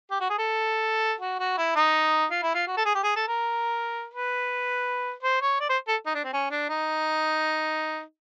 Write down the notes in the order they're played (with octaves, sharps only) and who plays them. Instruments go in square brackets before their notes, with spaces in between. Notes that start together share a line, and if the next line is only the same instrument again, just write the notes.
[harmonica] G4
F#4
G#4
A4
F#4
F#4
E4
D#4
F4
E4
F4
F#4
A4
G#4
G4
G#4
A4
A#4
B4
C5
C#5
D5
C5
A4
D#4
D4
C4
C#4
D4
D#4